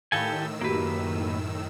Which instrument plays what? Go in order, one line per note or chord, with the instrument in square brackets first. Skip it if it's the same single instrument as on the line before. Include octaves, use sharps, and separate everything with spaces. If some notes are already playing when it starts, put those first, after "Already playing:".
[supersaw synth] A2 D#3 E6 [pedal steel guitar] G4 A4 G#5 [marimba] F5 B5
[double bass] F#2 [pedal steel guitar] A#3 B4 [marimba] F#4 G4